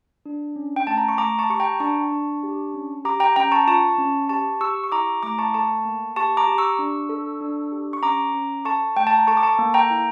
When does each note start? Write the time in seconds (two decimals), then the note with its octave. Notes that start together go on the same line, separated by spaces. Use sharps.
0.26 D4
0.56 C#4
0.76 G5
0.87 A3 A5
0.97 A#5
1.08 C#6
1.18 A3 A#5 D6
1.39 A5 C#6
1.50 G4 C#6
1.60 G5 A#5
1.80 D4 A5 C#6
2.12 D4
2.43 G4
2.74 C#4
3.05 G4 A#5 D6
3.20 G5 A#5
3.36 C#4 G5 A#5
3.52 A5 C#6
3.67 F4 A5 C#6
3.98 C#4
4.29 G4 A5 C#6
4.61 G4 C#6 E6
4.84 C#6
4.92 E4 A#5 D6
5.23 A3 A#5 D6
5.38 A5 C#6
5.54 A4 A5 C#6
5.85 A#3
6.16 G4 A5 C#6
6.37 A#5 D6
6.47 G4
6.58 C#6 E6
6.79 D4
7.09 A4
7.41 D4
7.72 G4
7.93 C#6
8.03 C#4 A#5 D6
8.34 C#4
8.65 A4 A5 C#6
8.97 A3 G5
9.07 A5
9.17 A#5
9.27 A4 A5 C#6
9.37 D6
9.43 A5 C#6
9.59 A#3
9.74 G5 A#5
9.90 E4